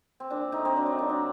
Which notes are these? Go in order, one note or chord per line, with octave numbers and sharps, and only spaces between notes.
C4
A#2 D4
A3 D#4
C4
F#3 D4
D#4
A#2 D4
D4